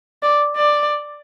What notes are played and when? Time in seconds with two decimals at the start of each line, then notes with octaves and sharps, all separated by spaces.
0.22 D5
0.56 D5